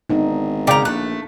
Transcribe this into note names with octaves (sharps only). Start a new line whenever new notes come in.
G#1 B3 D4 D#4
C#3 D5 F5 G5 A#5 D6
A#1 A3 F#6